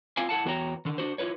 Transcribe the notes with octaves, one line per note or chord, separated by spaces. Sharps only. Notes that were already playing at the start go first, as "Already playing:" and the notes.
C4 F4 F5 G#5
E4 A4 F#5 A5
E2 B3 F#4 C#5 G5 A#5
D3 D#3
D4 F#4 C5
E4 F4 B4 C#5